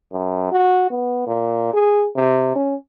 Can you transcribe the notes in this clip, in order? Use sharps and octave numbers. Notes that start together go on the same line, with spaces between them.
F#2
F#4
B3
A#2
G#4
C3
C#4